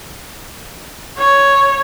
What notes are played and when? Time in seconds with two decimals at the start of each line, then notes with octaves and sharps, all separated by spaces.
1.18 C#5